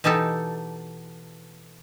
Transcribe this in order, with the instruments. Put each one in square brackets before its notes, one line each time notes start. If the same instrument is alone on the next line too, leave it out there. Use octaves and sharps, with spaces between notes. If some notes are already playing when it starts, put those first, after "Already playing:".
[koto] B2 E3 D#4 G4 A4